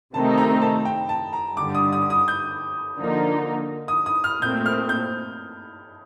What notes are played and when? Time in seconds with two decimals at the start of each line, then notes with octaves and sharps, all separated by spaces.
0.14 C3 D#3 A3 C4 D#4 A5
0.38 A#5
0.62 A5
0.85 G5
1.09 A5
1.33 A#5
1.57 G2 D3 G3 D6
1.75 D#6
1.93 D#6
2.10 D#6
2.28 G6
2.99 D3 F3 A#3 D#4
3.88 D#6
4.06 D#6
4.24 F6
4.42 A#2 A3 C4 G6
4.66 F6
4.89 G6